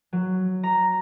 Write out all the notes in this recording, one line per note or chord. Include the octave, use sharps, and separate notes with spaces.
F#3
A#5